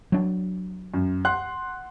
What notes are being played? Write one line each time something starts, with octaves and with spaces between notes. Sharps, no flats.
F#3 D4
F#2
F#5 C6 F#6